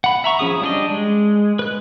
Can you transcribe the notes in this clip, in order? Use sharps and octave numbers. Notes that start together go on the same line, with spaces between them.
F#5 B5
E5 A#5 C#6
F3 C#4 G#4 D#6
G3 D4 D#5
G#3
B4 F#6